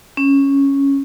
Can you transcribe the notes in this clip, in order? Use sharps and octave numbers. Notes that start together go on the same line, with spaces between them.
C#4